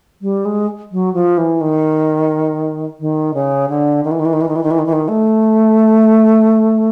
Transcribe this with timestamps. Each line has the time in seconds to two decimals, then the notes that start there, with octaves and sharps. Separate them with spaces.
0.22 G3
0.45 G#3
0.92 F#3
1.14 F3
1.38 E3
1.61 D#3
3.00 D#3
3.34 C#3
3.69 D3
4.04 D#3
4.11 E3
4.19 D#3
4.26 E3
4.33 D#3
4.41 E3
4.48 D#3
4.56 E3
4.63 D#3
4.71 E3
4.78 D#3
4.86 E3
4.93 D#3
5.08 A3